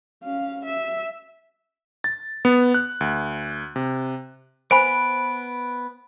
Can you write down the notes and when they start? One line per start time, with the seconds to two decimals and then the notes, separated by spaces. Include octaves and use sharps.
0.24 C#4 F5
0.65 E5
2.04 A6
2.45 B3
2.74 F#6
3.01 D2
3.76 C3
4.71 B3 B4 C5 G#5 B5 D7